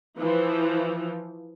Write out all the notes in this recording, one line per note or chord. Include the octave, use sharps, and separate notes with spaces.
E3 F3